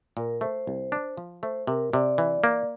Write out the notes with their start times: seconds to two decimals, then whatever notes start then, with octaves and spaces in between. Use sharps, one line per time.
0.17 A#2 A#4
0.41 A3 C5
0.67 C2
0.92 D4
1.17 F3
1.43 A3 C5
1.67 C3 A#4
1.93 C3 D5
2.18 E3
2.44 A#3